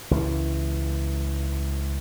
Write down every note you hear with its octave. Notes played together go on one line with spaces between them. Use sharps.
C#2 E3